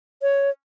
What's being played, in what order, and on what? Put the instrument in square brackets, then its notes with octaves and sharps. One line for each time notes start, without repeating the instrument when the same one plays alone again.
[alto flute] C#5